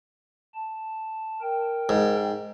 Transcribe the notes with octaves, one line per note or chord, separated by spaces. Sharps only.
A5
A#4 G5
G#2